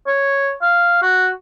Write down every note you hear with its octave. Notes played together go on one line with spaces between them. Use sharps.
C#5
F5
F#4